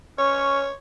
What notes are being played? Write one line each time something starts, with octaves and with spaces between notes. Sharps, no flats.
C#4 C#5